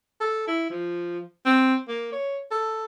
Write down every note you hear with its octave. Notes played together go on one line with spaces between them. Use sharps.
A4
E4
F3
C4
A#3
C#5
A4